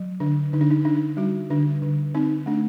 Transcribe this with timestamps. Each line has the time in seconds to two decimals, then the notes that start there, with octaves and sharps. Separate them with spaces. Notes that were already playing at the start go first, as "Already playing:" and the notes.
Already playing: F#3
0.20 D3 D4
0.53 D3 D#4
0.61 D4
0.70 D#4
0.85 D4 D#4
1.17 G3 F#4
1.50 D3 D4
1.82 D3
2.15 C4 D#4
2.46 A3 D4